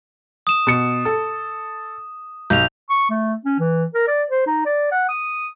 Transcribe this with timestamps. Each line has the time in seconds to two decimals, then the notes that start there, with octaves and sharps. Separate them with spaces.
0.47 D#6 E7
0.67 B2 C#7
1.05 A4
2.50 B1 G6 F7
2.90 C#6
3.10 A3
3.45 C#4
3.59 E3
3.94 A#4
4.08 D5
4.30 C5
4.47 D#4
4.66 D5
4.92 F#5
5.09 D#6